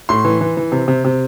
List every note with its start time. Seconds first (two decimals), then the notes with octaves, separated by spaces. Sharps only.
0.09 A2 C6
0.25 E3
0.41 E3
0.57 E3
0.72 C3
0.88 C3
1.05 C3